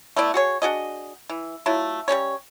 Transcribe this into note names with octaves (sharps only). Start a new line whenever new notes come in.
A3 B3 E4 D5
F#4 G#4 C#5
D4 F#4 G#4 D#5
E3
F#3 A3 E4 F4
G3 A#3 C#4 C#5